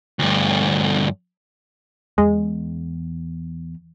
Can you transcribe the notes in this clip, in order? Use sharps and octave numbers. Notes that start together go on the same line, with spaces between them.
D2 G2
E2 G#3